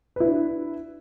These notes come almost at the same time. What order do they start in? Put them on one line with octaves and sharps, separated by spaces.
B4 E4 D4